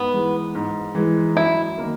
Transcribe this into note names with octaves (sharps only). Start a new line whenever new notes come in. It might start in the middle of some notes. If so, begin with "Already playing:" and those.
Already playing: G#2 B3
E3 G#3
G#2
E3 G#3
F#2 E4
D#3 A#3 D#4 A#4